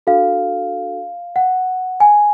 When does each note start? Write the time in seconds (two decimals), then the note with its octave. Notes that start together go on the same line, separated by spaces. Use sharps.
0.07 D4 F#4 A4 F5
1.36 F#5
2.00 G#5